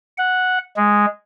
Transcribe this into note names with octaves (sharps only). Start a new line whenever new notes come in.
F#5
G#3